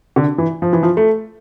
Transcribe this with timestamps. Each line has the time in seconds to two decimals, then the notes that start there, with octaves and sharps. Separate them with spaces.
0.16 D3
0.38 E3
0.62 F3
0.73 E3
0.83 F3
0.97 A3